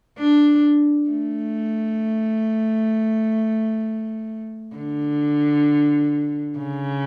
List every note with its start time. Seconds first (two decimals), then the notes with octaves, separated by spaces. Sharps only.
0.18 D4
1.10 A3
4.76 D3
6.58 C#3